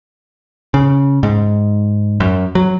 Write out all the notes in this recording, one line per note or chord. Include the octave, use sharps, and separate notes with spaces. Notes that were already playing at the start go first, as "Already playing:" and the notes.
C#3
G#2
F#2
F#3